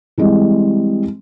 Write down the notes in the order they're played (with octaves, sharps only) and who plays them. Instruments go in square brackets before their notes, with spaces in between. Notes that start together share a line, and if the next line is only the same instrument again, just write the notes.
[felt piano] E3 G3 G#3 C4